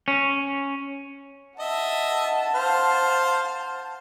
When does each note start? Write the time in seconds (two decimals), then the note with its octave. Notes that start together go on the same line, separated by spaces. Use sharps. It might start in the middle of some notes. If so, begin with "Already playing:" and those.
0.08 C#4
1.60 D#5 E5 F#5 A5
2.55 C5 F5